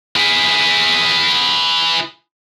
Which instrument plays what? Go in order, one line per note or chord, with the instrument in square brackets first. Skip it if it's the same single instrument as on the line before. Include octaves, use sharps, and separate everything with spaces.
[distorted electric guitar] E4 G#4